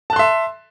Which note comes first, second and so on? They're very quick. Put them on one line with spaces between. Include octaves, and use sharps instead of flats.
A5 F#6 C6 E5